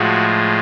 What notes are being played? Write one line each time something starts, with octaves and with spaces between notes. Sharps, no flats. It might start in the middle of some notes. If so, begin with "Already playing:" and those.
Already playing: A2 F3 G#3 F#4